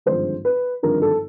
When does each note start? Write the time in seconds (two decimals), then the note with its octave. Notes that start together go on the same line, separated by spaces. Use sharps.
0.06 G#1 G2 D3 F3 G#3 C5
0.45 B4
0.82 G#1 G2 D3 F3 G#3 A#4
1.02 A4